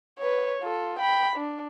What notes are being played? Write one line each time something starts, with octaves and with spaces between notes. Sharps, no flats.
B4 C#5
F4 A4
G5 B5
D4